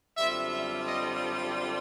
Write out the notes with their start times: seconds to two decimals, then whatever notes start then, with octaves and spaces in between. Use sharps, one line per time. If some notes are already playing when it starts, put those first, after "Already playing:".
0.16 F#2 D3 G3 C4 F4 E5
0.52 E5
0.87 D#5